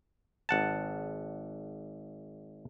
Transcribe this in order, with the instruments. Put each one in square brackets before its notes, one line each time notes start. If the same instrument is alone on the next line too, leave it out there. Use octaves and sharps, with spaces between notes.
[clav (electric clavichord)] G#1 F#5 A5